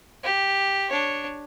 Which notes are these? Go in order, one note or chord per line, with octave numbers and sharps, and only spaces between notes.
G4
D4 C#5